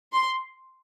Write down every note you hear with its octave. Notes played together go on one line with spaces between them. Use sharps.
C6